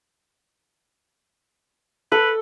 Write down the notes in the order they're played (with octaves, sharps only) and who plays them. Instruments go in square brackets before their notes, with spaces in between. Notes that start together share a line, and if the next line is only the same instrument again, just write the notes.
[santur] A4 [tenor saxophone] B4